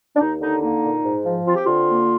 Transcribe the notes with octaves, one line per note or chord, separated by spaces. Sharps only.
D4
D#2 D#4
D3 D#4
A#3 D#4
A#2
G#2
F3
C4 F4
G4
D3 F4
A#3